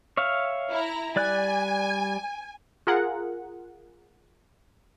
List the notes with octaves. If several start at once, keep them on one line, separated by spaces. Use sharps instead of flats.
C#5 E5 F5
E4 A#5
G3 D5 G#5 F#6
F4 G#4 A#4 F#5